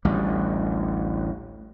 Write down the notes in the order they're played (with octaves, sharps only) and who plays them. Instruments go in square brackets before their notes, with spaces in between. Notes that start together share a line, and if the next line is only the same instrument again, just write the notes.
[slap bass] A1 D2 G3